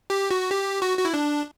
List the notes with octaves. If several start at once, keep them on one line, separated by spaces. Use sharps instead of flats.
G4
F#4
G4
F#4
F#4
E4
D4